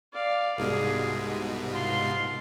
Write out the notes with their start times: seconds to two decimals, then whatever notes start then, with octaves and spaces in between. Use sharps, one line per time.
0.13 D5 F5
0.58 C2 G#2 B2 G#4
1.71 F4 C6